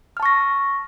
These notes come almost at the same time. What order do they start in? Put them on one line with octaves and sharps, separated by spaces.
F6 A5 C#6 A#6